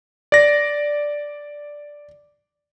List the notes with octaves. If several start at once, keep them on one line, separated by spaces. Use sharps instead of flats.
D5 A#6